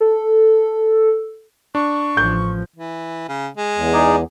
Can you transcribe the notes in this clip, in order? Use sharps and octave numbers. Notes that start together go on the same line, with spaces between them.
A4
D4 C#6
A1 F3 G6
E3
C#3
G#3
E2
D#4 G#4 D5